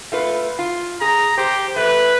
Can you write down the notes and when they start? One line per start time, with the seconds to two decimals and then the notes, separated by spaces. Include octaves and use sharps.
0.12 A3 F4 B4
0.59 F4
1.01 G#4 A#5
1.38 G4 C5
1.76 A3 B4